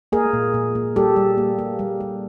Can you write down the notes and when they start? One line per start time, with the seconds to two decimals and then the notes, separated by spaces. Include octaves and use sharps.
0.12 A#3 G#4 A#4
0.33 A#2
0.54 A#2
0.75 A#2
0.96 G3 G4 A4
1.16 G3
1.38 A#3
1.59 A#3
1.79 G3
2.00 G3